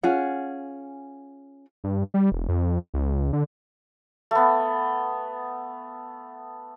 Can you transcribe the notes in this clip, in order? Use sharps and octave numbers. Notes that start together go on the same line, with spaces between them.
C#4 F4 G#4 F#5
G2
G3
E1
F2
C#2
D3
A3 B3